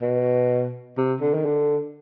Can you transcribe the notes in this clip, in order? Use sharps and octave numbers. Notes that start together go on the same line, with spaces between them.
B2
C3
D3
D#3
D3